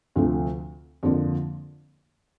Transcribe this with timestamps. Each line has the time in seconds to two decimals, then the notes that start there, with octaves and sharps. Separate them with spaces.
0.16 D2 C3 F3 A3
1.03 F2 D3 F3 A#3